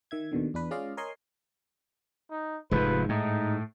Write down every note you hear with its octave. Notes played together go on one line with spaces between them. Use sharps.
D#3 E5 G#6
D#2 B2 D3 D#3
E2 D4 B4
G#3 C#4 F4 D5 D#5 F5
A#4 C#5 D#5 G#5 C6
D#4
F1 G#2 C3 F3 B4
A2 D#4